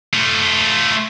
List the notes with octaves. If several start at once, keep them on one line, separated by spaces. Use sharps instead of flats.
A3 F4